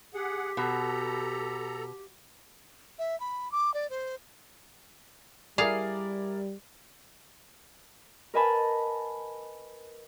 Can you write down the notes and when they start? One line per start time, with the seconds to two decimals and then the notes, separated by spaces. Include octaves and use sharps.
0.14 G4 G#4 F#5
0.57 B2 A4 A#5
2.99 E5
3.20 B5
3.52 D6
3.74 D5
3.90 C5
5.58 G3 E4 G#4 A#4 D5 F5
8.34 A#4 B4 D#5 G#5 A5 B5